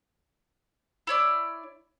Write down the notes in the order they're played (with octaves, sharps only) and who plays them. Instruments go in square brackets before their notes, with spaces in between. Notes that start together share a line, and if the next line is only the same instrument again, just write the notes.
[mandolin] E4 C#5 D5